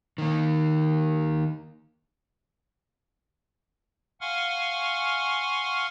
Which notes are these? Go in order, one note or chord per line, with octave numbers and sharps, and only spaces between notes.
D#3 A#3
F5 F#5 G#5 C6 C#6 F6